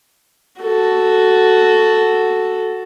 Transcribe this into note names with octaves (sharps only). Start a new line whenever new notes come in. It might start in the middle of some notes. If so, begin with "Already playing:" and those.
F#4 A4